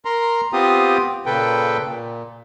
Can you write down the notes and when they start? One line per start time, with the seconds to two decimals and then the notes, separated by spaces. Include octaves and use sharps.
0.05 A#4 A#5 C6
0.53 B3 C4 F4 G4 D#6
1.26 A#2 C#3 A4 B4 G5
1.85 A#2